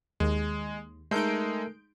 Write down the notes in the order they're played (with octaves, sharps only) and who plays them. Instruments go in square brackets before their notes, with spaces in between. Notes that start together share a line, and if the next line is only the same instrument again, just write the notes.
[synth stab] D#2 [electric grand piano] G#3
[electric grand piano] G#3 D#4 [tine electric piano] A3 A4 A#4 [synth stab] G6 D7